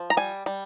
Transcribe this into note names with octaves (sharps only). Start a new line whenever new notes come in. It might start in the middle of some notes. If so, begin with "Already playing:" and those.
Already playing: F3
A#5
G3 G#5
G3